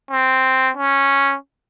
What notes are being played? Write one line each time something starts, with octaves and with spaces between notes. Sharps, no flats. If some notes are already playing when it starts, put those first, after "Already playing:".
C4
C#4